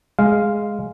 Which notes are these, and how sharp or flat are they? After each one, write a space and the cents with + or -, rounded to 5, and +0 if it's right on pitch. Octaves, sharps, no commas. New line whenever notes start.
G#3 +0 F5 +0